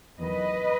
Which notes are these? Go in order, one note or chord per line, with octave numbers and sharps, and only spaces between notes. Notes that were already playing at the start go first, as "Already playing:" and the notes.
E2 D#3 F#3 B4 D#5